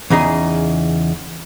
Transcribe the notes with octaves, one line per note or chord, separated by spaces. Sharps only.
E2 C#3 D#4 G#4